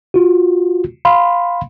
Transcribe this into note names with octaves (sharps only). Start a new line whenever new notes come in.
F4 F#4
F5 B5 C6